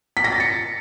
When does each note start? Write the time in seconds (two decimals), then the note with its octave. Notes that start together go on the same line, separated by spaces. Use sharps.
0.17 B6
0.24 A#6
0.32 A6
0.40 C#7